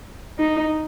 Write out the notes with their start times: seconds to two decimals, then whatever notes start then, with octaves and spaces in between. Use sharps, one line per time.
0.38 D#4